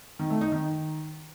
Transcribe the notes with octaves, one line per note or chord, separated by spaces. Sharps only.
D#3
A3
D#4
D#3